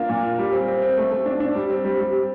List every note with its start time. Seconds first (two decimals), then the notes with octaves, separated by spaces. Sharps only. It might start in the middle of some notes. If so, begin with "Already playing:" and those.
Already playing: A#3 D4 F4
0.09 A#2
0.23 F4
0.39 G3
0.52 C4
0.68 C4
0.82 C4
0.97 A3
1.11 A3
1.26 D4
1.40 D4
1.55 G3
1.70 C4
1.85 G3
2.00 G3